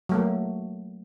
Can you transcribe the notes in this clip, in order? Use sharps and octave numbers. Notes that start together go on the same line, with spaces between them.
F#3 A3 A#3